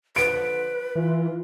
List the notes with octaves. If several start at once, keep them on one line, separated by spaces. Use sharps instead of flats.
D3 F3 B4 D7
E3 F4